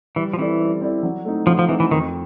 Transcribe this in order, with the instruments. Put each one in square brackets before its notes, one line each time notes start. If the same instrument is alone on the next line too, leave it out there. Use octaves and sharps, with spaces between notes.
[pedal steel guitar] E3 [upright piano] G3
[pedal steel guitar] F3
[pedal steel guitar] E3 [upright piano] C4 E4 A4 D5
[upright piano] G3
C4 E4 A4 D5
F#3
A3 C4 D#4
[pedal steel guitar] F3 [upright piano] F#3
[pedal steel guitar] F3
[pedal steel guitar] E3 [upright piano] A3 C4 D#4
[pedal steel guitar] E3
[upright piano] F2 [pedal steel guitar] D#3